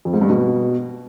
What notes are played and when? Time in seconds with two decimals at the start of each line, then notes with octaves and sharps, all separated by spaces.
0.05 F2
0.13 G#2
0.21 G2
0.30 B2